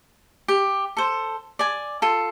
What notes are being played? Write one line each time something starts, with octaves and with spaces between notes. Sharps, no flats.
G4
A4 C5
D5 G#5
F4 A4